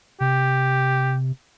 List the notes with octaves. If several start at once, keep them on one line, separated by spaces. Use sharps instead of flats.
C3 G4